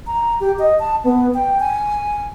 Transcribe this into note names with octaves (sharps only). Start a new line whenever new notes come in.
A#5
G4
D#5
A5
B3
G5
G#5